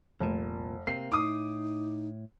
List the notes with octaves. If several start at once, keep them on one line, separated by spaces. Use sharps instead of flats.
F1 C2 A#2
C3 A#3 C4 C7
A2 D#4 D6 D#6